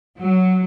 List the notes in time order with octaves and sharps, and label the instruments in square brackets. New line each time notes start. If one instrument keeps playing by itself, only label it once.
[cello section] F#3